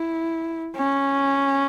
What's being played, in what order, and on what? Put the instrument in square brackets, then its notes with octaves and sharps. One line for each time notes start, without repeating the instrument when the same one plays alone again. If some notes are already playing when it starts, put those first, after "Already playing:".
Already playing: [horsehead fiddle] E4
C#4